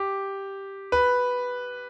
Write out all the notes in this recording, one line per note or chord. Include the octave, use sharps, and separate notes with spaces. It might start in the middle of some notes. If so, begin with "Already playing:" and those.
Already playing: G4
B4